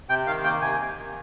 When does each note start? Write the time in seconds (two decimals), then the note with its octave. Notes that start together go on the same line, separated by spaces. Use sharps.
0.09 C3 G5
0.27 D#3 F5
0.44 A#3 G5
0.62 C3 G#5
0.79 C3
0.96 D#3